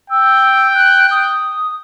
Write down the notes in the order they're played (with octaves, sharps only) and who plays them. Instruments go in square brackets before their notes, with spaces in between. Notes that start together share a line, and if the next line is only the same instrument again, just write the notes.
[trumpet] G5 [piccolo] E6
[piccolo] F#6
D#6